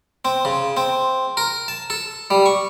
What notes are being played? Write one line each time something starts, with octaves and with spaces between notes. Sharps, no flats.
C4
C#3
C4
A#4
A5
A4
G3
C#6